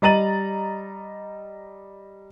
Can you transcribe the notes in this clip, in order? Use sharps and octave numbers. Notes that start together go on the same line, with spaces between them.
G3 D#5 A#5 A6 D#7 F#7